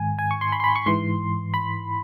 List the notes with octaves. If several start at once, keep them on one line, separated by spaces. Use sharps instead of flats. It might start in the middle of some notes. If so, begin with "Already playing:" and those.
Already playing: G#2 D#3 G#5
G#5
C#6
C6
B5
C6
B5
C#6
G#2 E3 C6
B5